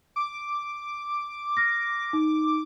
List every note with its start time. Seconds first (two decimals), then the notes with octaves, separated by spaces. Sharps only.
0.16 D6
1.57 F6 A#6
2.13 D#4